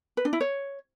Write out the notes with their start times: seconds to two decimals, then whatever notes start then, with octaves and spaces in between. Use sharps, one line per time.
0.17 B4
0.25 D4
0.33 E4
0.41 C#5